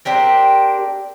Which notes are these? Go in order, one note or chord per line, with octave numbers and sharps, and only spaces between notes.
C4 D4 G4 A#4